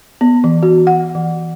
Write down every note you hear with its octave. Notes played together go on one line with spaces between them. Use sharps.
B3
E3
F#4
F#5
E3